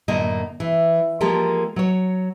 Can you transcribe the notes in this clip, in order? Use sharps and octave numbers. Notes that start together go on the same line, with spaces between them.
F#2 A2 D3 A#3 D#5
E3
F3 G#3 A#3 G4 A4 A#4
F#3 C#5